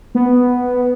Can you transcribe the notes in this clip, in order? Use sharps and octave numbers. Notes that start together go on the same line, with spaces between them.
B3